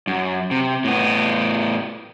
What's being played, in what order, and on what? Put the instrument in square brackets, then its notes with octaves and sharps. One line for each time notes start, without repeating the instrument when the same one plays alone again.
[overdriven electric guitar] F#2
C3
A2 B3